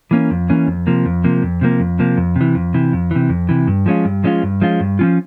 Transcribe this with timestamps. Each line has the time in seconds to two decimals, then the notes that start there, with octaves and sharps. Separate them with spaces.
0.11 E3 A#3 C#4
0.31 F2
0.49 E3 A#3 C#4
0.67 F2
0.87 C3 F3 A#3
1.06 F2
1.24 C3 F3 A#3
1.43 F2
1.61 C3 F3 A#3
1.80 F2
1.99 C3 F3 A#3
2.17 F2
2.36 C3
2.41 E3
2.55 F2
2.74 C3 E3
2.93 F2
3.11 C3 E3
3.29 F2
3.49 C3 E3
3.67 G2
3.86 F3 G#3 C#4 F4
4.05 G2
4.24 F3 G#3 C#4 F4
4.43 G2
4.61 F3 G#3 C#4 F4
4.80 G2
4.99 F3 G#3 C#4 F4